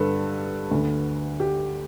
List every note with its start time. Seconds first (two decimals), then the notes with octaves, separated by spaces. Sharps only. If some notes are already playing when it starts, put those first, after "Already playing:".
Already playing: G2 D3 A4 B4
0.71 D2 D3
1.40 G4